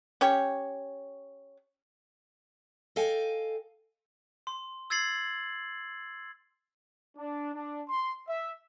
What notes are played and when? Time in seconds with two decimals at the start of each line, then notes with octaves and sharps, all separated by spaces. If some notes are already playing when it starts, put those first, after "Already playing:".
0.21 C#4 G4 C#5
2.96 A4 D#5 F5 G5 G#5
4.47 C6
4.90 E6 G#6 A6 C7 F#7
7.17 D4
7.53 D4
7.89 C6
8.27 E5